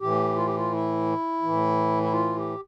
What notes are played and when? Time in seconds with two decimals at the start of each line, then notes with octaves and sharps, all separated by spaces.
0.01 A2 E3 G4
0.36 F4
0.46 G4
0.56 F4
0.72 E4
1.42 A2 E3
2.03 E4
2.12 F4
2.36 G4